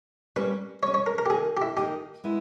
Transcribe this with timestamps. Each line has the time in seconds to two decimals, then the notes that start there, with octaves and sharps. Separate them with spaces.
0.36 G3 A#3 C#4 B4
0.82 G3 A#3 C#4 C#5
0.94 C#5
1.06 A#4
1.18 A#4
1.26 G4
1.30 D#3 A#3 D#4 G#4 A#4 D#5
1.57 G4
1.62 E4
1.77 D#3 A#3 D#4 G4 A#4 D#5
2.24 G#3 B3 E4